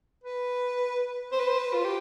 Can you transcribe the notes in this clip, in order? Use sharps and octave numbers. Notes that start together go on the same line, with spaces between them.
B4
C5
B4
C5
B4
F4
G4